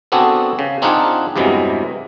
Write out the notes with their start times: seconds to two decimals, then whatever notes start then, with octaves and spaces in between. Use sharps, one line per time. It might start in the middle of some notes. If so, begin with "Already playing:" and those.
0.12 B3 C4 D4 F#4 G#4 A4
0.59 C#3
0.82 C4 D4 D#4 F4 G#4 F#5
1.36 E2 G2 C3 E3 F#3 G#3